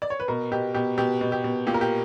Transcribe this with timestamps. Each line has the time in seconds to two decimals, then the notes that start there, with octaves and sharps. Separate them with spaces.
0.02 D5
0.10 C#5
0.20 B4
0.28 B2 A#4
0.51 B2 G4
0.74 B2 G4
0.98 B2 G4
1.21 B2
1.32 G4
1.44 B2
1.67 A#2 G4
1.74 A#4
1.81 G4